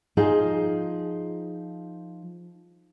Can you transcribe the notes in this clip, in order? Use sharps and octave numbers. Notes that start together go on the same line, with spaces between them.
F3 D#4 F4 G#4